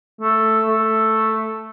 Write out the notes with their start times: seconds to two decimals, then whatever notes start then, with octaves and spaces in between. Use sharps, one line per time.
0.21 A3
0.68 A3